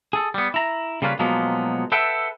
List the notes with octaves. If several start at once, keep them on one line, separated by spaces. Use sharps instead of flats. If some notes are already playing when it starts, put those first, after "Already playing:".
G#4 A4
G3 B3
E4 A#5
C#3 G3 A#3 C#4 F4 B4
B2 F3 F#3 G#3 A#3 B3
A4 B4 E5 F#5 G5